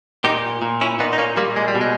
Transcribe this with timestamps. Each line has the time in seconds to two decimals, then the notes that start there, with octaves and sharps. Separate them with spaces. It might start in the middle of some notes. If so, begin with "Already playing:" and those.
0.24 A#2 D#4 G4
0.62 A#2
0.81 C#4 E4
0.99 A#2 B3 D#4
1.13 D#4
1.18 A#3 C#4
1.37 A#2 G3 A#3
1.56 G#3
1.68 G3
1.75 B2
1.81 G#3